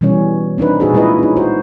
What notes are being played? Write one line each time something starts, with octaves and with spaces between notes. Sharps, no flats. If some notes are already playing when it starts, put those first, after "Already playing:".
B2 E3 G3 C#4 C#5
C4 D4 D#4 B4
A#2 D#4 F#4 G#4 A4
A#2 G#3 E4 F4 B4 D#5
C#4 D#4
F#4 C5